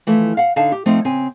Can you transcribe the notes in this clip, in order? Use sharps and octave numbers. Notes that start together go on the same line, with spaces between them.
E3 F3 A3
F5 F#5
D3 D#4 F5 A5
G4
F3 A3 C4 D#4
C#3 C4 G#5